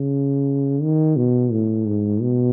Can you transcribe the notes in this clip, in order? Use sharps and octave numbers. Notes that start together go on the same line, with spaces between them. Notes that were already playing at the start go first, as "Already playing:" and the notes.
Already playing: C#3
D#3
B2
A2
G#2
B2